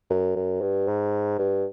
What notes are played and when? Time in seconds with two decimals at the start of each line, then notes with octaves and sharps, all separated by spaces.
0.10 F#2
0.36 F#2
0.61 G2
0.88 G#2
1.38 G2